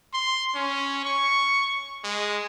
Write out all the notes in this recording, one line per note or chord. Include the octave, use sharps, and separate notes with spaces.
C6
C#4
C#6
G#3